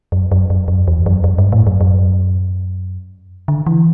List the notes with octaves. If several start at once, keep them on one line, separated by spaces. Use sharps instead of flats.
F#2
F#2
F#2
F#2
E2
F#2
F#2
G2
A2
F#2
F#2
D3
E3